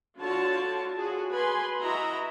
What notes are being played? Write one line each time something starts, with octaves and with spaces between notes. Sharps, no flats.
D3 F4 F#4 A4 C#5 A5
F#4 G#4
B4 G#5 C6
E4 F#4 D#5 E5 A#5 B5